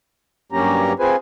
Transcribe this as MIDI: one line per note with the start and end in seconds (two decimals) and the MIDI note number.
0.52 0.93 43
0.52 0.93 54
0.52 0.93 58
0.52 0.93 61
0.52 0.93 67
0.52 0.93 82
0.99 1.16 60
0.99 1.16 65
0.99 1.16 68
0.99 1.16 71
0.99 1.16 72
0.99 1.16 80